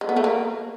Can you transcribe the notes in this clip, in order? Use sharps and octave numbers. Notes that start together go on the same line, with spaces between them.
G#3
B3
A3
A#3